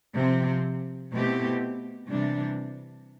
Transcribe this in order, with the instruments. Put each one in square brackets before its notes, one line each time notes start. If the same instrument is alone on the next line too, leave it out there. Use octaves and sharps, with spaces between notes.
[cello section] C3 F3 C4
B2 A3 C4 E4 G4
C3 E3 G3 D4